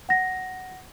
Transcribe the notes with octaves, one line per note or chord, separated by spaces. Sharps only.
F#5 A#6